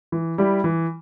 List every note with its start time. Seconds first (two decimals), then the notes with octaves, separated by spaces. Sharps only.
0.12 E3
0.38 G3 E4 G4
0.64 E3